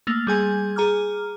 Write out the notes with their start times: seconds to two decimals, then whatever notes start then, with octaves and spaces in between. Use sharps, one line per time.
0.07 A3 A#3 F7
0.27 G3 G#4 G#5 G#6
0.76 G#4 A#5 D6 F6